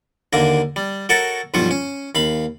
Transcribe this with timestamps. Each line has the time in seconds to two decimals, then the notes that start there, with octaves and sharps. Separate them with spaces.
0.33 D#2 D3 A#3 A#4
0.76 G3
1.09 F#4 A4 A#4 C#5 A5
1.54 B1 G2 F3 F4 C#6
1.71 C#4
2.15 D#2 F5 B5